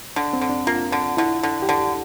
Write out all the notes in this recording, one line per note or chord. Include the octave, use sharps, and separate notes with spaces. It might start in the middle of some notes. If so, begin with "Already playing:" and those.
D3 D4
C4
D3
D4
A#3 F4
D3
D3 E4
D3
G4
D3 A4